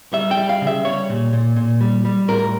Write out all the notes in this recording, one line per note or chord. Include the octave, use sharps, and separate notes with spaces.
G3 E5
G5
G3
F5
C#3
E5
G3 C#5
A#2
A#2
A#2
G3
G3
A2 A#4